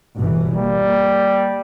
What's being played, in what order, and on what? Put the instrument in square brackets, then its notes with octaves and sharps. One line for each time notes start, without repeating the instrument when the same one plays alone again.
[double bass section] G1 B2 E3
[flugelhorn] G3 [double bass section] A#3